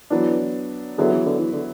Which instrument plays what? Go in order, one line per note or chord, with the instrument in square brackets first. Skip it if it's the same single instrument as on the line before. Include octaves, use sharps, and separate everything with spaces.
[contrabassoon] E3 [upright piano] F#3 B3 D4
[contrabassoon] D3 [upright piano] F#3 B3 E4 G#4
[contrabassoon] E3
D3
E3
D3